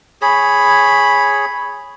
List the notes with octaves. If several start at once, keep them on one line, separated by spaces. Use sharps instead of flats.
G#4 C#5 B5